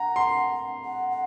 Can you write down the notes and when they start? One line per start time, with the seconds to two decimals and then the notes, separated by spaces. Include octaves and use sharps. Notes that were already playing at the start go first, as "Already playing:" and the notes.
Already playing: F#5 A#5
0.16 C6
0.85 F#5
1.10 F#5